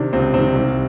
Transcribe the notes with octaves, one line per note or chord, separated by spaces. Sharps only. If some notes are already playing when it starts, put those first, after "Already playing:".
Already playing: C3 D#3 D4
C#2 C4
C3 D#3 C4
C2